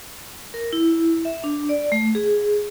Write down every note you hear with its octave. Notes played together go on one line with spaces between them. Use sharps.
A#4
E4
E5
D4
D5
A3
G#4